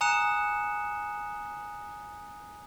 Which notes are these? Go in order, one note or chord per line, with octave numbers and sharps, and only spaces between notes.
G#5 A#5 D#6 F#6 C#7 E7